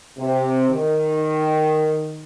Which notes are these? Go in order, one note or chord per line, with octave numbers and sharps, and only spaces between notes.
C3
D#3